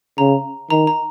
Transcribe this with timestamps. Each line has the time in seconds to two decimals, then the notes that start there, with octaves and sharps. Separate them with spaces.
0.18 C#3 A#5
0.70 D#3 A#5
0.87 A#5